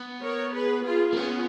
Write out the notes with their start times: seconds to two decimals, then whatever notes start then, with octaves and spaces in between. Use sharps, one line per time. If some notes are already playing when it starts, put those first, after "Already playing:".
Already playing: B3
0.22 A#4 C#5
0.54 G#4 B4
0.86 F4 G#4
1.13 A#3
1.17 B3 C#4 F4